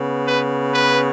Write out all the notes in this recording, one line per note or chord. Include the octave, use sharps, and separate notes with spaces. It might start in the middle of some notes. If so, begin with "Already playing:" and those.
Already playing: C#3 B3
B4
B4